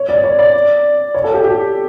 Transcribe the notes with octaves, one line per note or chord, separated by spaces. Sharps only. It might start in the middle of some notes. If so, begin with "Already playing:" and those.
Already playing: C#5
D5
C#5
D5
C#5
A4
G4
G4